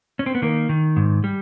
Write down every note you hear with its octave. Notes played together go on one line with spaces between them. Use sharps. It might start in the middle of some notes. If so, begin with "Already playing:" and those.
C#4
C4
B3
D#3 A#3
D#3
G#2
G3